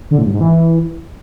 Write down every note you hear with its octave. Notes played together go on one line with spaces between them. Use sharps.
D3
A2
G2
G#2
E3